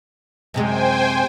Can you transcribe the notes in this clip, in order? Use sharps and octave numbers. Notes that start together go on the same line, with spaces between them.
F#2 C3 G#3 C5 G5 G#5